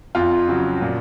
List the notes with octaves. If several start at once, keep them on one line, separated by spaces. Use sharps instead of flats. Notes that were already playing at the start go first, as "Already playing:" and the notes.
F2 F4
C#3 F#3
A#2